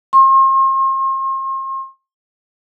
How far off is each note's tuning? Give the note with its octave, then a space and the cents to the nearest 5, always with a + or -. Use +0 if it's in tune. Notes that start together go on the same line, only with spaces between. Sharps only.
C6 +40